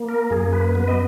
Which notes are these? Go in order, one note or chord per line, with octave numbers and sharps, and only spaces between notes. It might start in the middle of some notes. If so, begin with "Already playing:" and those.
Already playing: A#3
A#4
F#2 G#4
B4
B3 B4
D#5